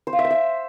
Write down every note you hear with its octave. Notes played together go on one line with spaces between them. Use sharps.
C5
F5
E5
C5
E5